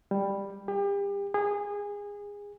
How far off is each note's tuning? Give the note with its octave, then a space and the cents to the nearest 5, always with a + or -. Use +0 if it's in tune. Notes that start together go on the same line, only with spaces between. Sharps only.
G3 +10
G4 +35
G#4 -25